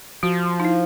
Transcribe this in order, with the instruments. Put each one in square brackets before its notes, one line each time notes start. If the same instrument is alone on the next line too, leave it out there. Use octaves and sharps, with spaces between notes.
[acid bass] F3 [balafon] F#4
[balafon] D#4
E4